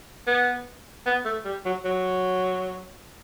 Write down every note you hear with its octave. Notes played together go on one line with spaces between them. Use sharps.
B3
B3
A3
G3
F#3
F#3